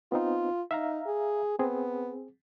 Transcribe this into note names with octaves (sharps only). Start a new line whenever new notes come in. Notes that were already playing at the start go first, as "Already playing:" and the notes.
B3 C4 D#4 F4
D#4 E5 F5 A#5
G#4
B3 C4 G#4